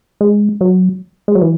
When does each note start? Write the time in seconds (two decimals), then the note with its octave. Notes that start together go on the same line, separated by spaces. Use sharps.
0.21 G#3
0.61 F#3
1.28 G#3
1.35 F#3
1.41 E3